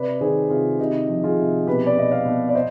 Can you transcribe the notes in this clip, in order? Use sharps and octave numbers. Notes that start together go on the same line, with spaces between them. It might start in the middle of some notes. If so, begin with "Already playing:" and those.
Already playing: C3 B4 D5
D#3 G#4 C5
C3 F4 G#4
C3 D#4 G4
F3
F4 G#4
C3
B2 G4 B4
D5
B2 D#5
D5 F5
B2
D5
C5 D#5